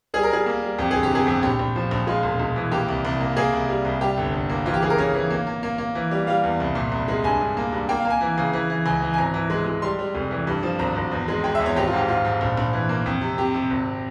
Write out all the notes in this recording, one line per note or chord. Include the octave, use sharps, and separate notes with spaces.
G3 G#4
A#4
G3 G#4
A#3
G3
F2 G4
G1 G#4
G4
C3 G#4
F2 G4
A#1 G4
A#1
F3
A#1
G#3 F4
E1
E1
E3
A#3 G4
C2
C2
A#3
A#3 G#4
C2
G3
C2
G3 G4
G1
G1
A#3
E3 F4
G4
C#3 G#4
A#4
C#3 C#5
E3
A#3
A#3
A#3
A#3
E3
G3
G3 F5
E2
C2
A#2
C2
G#3
G2 G#5
G2
A#3
G2
A#3 G5
F5
A#3
G#5
E3
C#3
E3
E3
C#2 G#5
E3
G#5
G#1 A#5
E3
G#3
G#3
G3 C6
G3
F1
E3
G2
F3
G#1 A#5
G#1
E2
G#3
G#3 G5
E5
E2
C#5
G#1 G4
F4
G#2 G4
G#2 F4
G#2
A#1
A#1
E3
A#3
F2
C3
C3 G4
C3
G#1